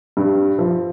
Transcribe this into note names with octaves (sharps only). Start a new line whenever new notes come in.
G2
F3